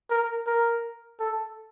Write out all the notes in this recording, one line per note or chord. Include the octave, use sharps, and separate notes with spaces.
A#4
A#4
A4